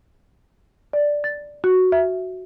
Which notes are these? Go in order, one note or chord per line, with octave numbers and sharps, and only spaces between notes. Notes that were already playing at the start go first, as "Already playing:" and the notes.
D5
A6
F#4
E5